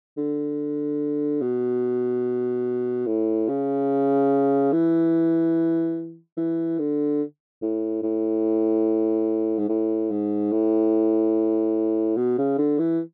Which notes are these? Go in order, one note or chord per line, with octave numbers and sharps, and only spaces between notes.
D3
B2
A2
C#3
E3
E3
D3
A2
A2
G#2
A2
G#2
A2
B2
C#3
D3
E3